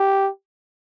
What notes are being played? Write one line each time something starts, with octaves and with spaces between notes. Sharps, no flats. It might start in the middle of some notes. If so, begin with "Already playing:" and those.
Already playing: G4